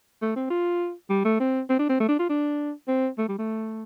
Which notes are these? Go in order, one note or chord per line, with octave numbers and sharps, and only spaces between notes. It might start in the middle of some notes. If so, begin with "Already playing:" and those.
A3
C4
F4
G3
A3
C4
C4
D4
C4
A3
D4
F4
D4
C4
A3
G3
A3